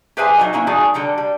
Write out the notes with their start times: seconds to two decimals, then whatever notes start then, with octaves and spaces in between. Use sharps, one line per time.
0.17 G4 G#4 B4 C5 E5 G#5
0.38 F#3 D#4 F#4 D#5
0.53 A#3 C#4 E4
0.67 F3 G#3 D#4 F#4 G#4 D5
0.94 D3 G3 A4 A#5
1.18 G3